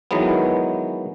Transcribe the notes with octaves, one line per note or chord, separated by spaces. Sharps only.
D#3 E3 F#3 G#3 B3